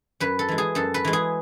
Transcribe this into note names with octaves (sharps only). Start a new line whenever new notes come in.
F#2 B4
A4
E3 G#3
G#4
F#2 A4
B4
E3 G#3
G#4